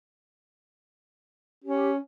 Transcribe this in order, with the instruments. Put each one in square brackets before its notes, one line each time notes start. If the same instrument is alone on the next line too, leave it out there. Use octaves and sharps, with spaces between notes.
[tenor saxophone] C#4 [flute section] G4